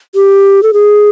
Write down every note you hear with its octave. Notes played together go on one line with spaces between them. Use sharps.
G4
A4
G#4